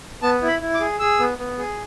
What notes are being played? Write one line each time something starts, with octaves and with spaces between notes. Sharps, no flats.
B3 A5
E4
B5
E4
D6
G#4
G#4 E6
B3
B3
G#4